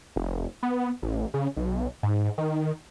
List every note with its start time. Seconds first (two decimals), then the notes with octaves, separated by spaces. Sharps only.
0.16 F1
0.63 B3
1.02 A1
1.34 C#3
1.56 B1
2.03 G#2
2.38 D#3